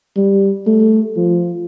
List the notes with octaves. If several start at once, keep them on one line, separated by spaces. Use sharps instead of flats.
G3
A3
F3